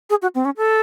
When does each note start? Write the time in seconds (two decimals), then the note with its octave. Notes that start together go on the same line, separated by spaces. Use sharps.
0.10 G#4
0.22 F#4
0.35 C4
0.45 C#4
0.57 A4